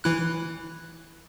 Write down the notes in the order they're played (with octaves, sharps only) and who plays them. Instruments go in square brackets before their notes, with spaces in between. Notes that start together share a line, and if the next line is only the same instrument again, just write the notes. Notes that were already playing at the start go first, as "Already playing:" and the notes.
[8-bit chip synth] E3 E4 F#6